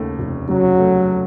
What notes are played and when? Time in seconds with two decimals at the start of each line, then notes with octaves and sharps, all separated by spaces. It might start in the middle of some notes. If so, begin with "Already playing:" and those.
Already playing: D#2 C#3 A3
0.19 F1
0.49 C#3 F#3
0.79 A3